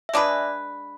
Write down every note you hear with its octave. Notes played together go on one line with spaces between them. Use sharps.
E5
G#3 D4 G#4 B4 D5